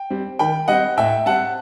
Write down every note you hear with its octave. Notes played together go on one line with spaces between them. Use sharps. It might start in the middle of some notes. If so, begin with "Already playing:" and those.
Already playing: G5
G3 C4
D#3 G5 B5
G3 C4 D#5 F#5
A2 E5 G5
G3 C4 F#5 A5